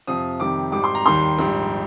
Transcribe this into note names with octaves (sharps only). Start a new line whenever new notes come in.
F2 C3 F3 D#6
F2 C3 D#3 G3 D6
G#1 G#2 G3 D6
C6
A#5
D#2 D#3 G3 C6
A#1 G#2 G3